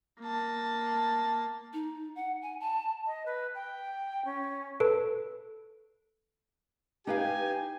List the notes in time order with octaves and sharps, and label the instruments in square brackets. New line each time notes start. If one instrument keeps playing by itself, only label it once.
[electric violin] A#3 A5
[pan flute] D#4
F#5
G#5
A5
[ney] D#5
B4
G5
C#4
[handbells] A4 B4
[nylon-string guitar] D#4 B4 F5 [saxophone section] G4 [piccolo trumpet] G#5